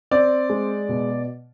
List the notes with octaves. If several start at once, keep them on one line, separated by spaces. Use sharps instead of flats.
C4 D5
G#3
B2